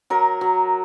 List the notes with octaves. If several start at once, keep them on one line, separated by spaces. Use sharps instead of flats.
F#3 A#4
F#3